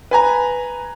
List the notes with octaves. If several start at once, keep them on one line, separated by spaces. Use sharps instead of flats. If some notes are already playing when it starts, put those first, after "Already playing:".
B4 G#5 A#5